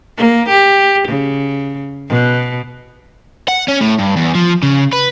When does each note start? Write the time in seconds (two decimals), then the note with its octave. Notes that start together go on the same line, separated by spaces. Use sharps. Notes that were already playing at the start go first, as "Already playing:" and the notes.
0.18 A#3
0.49 G4
1.08 C#3
2.09 B2
3.48 F#5
3.68 C#4
3.81 A2
3.99 G2
4.17 E2
4.35 F3
4.63 C#3
4.93 B4